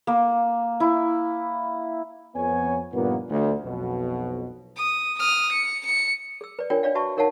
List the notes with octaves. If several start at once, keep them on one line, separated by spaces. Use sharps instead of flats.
A#3
E4
F2 B3 C#5 G#5
G2 A#2 D#3 F3 A#3 B3
D2
B1 F2 B2
D#6
D#6 F6
C#7
C#7
G#4 E6
B4 D5
D4 F4 A#4 C#5 G5 G#5
D4 C#5 D5 F5
F#4 B4 E5 A5 C#6
D#4 A#4 C#5 F5 F#5 A5